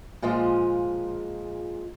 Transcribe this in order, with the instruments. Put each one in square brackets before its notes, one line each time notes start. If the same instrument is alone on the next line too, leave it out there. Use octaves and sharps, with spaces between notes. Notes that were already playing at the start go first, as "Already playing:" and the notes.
[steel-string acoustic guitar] A#2 F3 G#3 F4 G#4